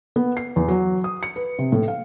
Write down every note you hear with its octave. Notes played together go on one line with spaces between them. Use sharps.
B3
C7
E2
F#3
D#6
C#7
B4
C3
A2
F5